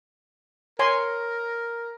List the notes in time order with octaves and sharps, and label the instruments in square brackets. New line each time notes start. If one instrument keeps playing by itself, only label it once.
[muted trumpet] A#4 [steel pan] C#5 G#5 C6